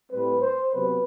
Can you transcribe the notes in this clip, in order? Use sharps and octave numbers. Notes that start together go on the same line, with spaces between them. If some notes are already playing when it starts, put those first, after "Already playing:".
A2 G3 C4 B4
C5
C3 F#3 B3 B4